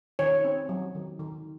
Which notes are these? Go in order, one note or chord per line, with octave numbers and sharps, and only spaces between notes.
D#3 C#5
C4
F#3
D#3
D#3